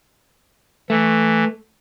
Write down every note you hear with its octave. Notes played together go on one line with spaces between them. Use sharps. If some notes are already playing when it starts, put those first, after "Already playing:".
E3 A3